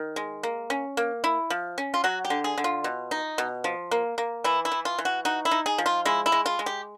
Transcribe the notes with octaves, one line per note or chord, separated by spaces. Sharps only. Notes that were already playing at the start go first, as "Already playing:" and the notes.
Already playing: D#3
G#3
A#3
C#4
A#3
E4
F3
C#4
F4
F#3 F#4
G4
D3
G#4
D3
F4
B2
D#4
B2
F3
A#3
A#3
E3 E4
E4
E3
F4
E3
F#4
D#4 F#4
E4
D#4
G#4
F3
F4
G#3 E4
E4
G#3
F4
G#3
G4